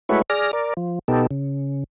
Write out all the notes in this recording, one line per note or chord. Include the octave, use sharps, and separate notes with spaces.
G#3 A3 E4 F#4 B4 C#5
G#4 D5 F6 A#6
A#4 D5
F3
B2 B3 D#4 G4 A4
C#3